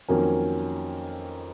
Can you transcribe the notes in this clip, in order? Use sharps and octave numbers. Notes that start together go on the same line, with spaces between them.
F2 D#3 F#3 A#3 C#4